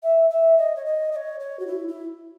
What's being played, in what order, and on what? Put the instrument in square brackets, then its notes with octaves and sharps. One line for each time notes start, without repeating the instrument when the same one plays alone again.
[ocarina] E5
E5
D#5
C#5
D#5
D#5
C#5
C#5
F#4
E4
E4